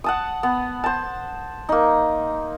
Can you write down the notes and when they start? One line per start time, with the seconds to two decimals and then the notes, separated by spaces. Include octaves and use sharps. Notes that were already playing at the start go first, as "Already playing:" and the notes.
0.04 F#5 A5 D#6
0.43 B3
0.84 C5 A5
1.69 A#3 D#4